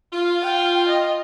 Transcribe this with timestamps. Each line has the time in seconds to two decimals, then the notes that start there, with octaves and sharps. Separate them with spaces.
0.13 F4
0.42 G5
0.89 D#5